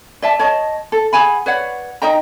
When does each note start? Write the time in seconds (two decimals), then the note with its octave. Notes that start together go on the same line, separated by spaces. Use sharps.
0.22 D5 E5 A5
0.39 C#5 D#5 A5
0.92 A4
1.13 G#4 F#5 G#5 B5
1.46 B4 C#5 D5 F#5
2.02 D#4 D#5 G5 A#5